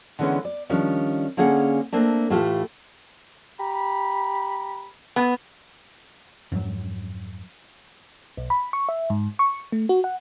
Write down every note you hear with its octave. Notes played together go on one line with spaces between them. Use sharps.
D3 E3 G#3 B3 C#4
D5
D#3 F3 G3 C#4 D4
D3 A#3 C#4 G#4 F#5
A3 A#3 C4 D4
A2 E3 A3 F4 G4
G4 A#5 B5
B3
F2 G#2 F#3
B1
B5
C#6
E5
G#2
C#6
A3
F#4
F#5